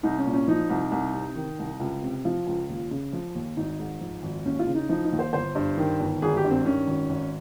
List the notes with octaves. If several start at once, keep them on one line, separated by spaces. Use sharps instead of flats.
C2 D#4
C#4
A#2
C#4
F3 D#4
C2
C2
C3
D#3
C2
C#2
C3
F3 F4
C#2
D#2
C#3
F3
D#2
G#1 D#4
G#2
F3
G#1
D#2 C#4
F4
C#3
D#4
F3 D#4
D#4
D#2
C5
G1 C5
G2
D#3
G1
G#1 G#4
G4
G2
C4
D#3 C#4
G#1
G#1